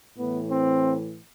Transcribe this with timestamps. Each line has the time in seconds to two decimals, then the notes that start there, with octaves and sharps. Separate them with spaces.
0.18 A2 E3 B3
0.50 C4